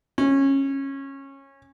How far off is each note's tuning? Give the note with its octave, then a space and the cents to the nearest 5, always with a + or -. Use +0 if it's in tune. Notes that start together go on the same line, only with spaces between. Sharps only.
C#4 -20